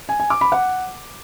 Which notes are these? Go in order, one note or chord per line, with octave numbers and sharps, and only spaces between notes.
G#5
G#5
D6
B5
F#5